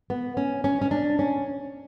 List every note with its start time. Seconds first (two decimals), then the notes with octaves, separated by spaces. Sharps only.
0.10 B3
0.37 C#4
0.64 C#4
0.82 C#4
0.91 D4
1.19 C#4